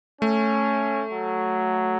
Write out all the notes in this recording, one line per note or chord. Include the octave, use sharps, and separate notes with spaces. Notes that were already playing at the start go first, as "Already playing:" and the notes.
A3 C#4
F#3